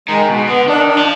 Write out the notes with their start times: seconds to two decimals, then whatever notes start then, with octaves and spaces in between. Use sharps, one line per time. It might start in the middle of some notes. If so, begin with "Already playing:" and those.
0.08 D#3 G#3
0.28 B2 G#3
0.47 D3 B3
0.67 D#3 D4
0.87 D4
0.97 F3